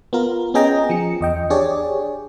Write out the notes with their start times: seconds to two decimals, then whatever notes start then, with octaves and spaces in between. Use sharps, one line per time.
0.13 B3 F4 A#4
0.54 B3 C#4 G#4 D#5 G5 A#5
0.90 F3 C#7
1.21 E2 D#5 G5
1.50 D4 G4 G#4 C#5 D5